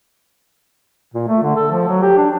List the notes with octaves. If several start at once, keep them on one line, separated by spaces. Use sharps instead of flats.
A#2
A3
D3
A4
F3
F#3
G4
D4